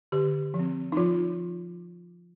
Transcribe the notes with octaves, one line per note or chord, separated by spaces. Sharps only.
D3 G4
F3
C4
D#4
F3 F4